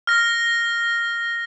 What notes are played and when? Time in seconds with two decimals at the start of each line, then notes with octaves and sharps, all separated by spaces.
0.07 F6 A#6